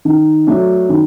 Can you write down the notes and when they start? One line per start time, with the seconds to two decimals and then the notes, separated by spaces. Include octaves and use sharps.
0.05 D#3
0.47 F#3 A3 D4
0.89 D#3